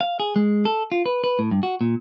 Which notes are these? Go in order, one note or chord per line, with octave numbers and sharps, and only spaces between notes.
F5
G#4
G#3
A4
F4
B4
B4
A2
G2
F#4
A#2